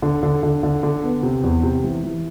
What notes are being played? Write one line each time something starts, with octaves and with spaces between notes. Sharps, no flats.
D3
D3
D3
D3
D3
B3
C3
E2
C3
E3
E3